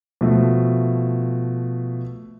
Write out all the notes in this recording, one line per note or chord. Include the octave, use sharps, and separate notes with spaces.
B2 F3 A3